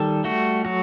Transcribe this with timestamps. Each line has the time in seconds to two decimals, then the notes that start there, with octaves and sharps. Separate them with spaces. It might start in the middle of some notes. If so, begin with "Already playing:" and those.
Already playing: D#3 G3 A4
0.24 A3 F#4
0.65 F#3 F#4